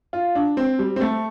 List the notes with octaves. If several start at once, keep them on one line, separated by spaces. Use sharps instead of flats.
F4
D4
C4
G3
C4
A3